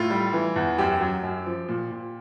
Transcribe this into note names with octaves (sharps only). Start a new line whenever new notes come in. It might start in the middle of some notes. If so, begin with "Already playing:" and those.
Already playing: A2 F4
G3
E3
E2
F#2 G4
F#3
F#2
F3
A#2
A#2